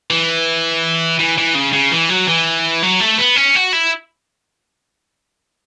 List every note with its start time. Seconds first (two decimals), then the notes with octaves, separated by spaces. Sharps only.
0.10 E3
1.20 E3
1.38 E3
1.55 C#3
1.73 C#3
1.91 E3
2.09 F#3
2.28 E3
2.82 F#3
3.00 A3
3.18 B3
3.36 C#4
3.55 F#4
3.73 E4